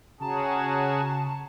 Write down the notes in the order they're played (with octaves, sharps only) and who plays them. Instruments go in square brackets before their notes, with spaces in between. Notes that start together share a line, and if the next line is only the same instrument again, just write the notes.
[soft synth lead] C#3 [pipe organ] C#4 F#4 G#4 [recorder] A5 [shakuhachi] A#5